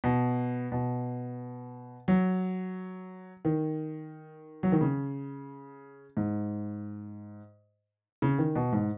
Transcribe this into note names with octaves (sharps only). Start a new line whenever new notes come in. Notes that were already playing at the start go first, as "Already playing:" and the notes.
B2
B2
F#3
D#3
F#3
D#3
C#3
G#2
C#3
D#3
B2
G#2